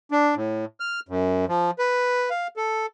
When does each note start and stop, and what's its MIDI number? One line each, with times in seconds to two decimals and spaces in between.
0.11 0.35 62
0.36 0.65 45
0.80 1.00 89
1.09 1.45 42
1.48 1.71 53
1.79 2.30 71
2.30 2.47 77
2.57 2.86 69